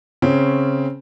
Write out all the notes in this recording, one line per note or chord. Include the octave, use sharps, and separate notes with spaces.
C#3 C4 C#4